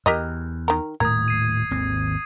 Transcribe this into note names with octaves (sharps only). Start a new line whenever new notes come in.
E2 G4 A#4 D#5
D#3 A#4
D#1 A2 A#4 D#6 G#6
C7 D#7
G#1 D#2 C4